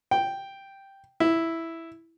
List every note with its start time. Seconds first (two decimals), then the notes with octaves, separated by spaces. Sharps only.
0.11 G5
1.20 E4